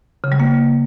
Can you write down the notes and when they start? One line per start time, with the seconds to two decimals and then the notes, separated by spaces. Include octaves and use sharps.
0.24 C#3
0.32 G3
0.40 A#3